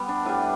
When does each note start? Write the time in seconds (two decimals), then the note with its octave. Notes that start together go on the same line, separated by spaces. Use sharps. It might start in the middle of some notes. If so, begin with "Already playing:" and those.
Already playing: G3 B3
0.09 D4
0.25 A2 G3 B4